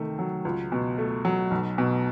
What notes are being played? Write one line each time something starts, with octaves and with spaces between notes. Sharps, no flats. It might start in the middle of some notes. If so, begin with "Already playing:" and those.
Already playing: C3 D#3 A3
F#3
C#2
B2
A3
F#3
B1
B2